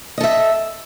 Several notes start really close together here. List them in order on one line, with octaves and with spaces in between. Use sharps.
D#5 A4 E5